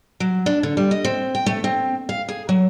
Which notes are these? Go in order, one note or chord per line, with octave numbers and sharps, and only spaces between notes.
F#3
D4
D3
G3
D#5
C4
G5
A3
C4
F5
G#4
F#3